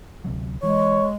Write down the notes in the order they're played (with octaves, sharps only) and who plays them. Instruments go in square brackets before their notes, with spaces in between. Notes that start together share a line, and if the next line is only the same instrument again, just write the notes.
[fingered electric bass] D2 C3 F#3
[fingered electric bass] E3 [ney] G#3 [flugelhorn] C#5